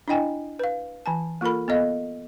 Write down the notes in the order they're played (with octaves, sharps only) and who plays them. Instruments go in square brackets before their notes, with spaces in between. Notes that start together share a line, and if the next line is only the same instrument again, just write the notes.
[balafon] D4 E4 D#5 G5 G#5
B4 F5
E3 G#5 A5
A#3 F4 A4 A#4 B5
B3 A4 D#5 F5